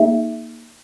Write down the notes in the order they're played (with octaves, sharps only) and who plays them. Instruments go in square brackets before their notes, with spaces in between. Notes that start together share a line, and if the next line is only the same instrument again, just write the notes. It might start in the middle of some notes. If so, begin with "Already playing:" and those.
Already playing: [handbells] A#3 D#4 G#4 E5